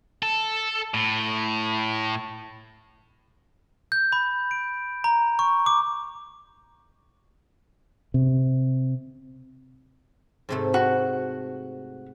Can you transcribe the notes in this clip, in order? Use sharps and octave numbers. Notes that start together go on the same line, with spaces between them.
A4
A2
G6
B5
D7
A#5
C#6
D6
C3
G#2 C3 A3
F#4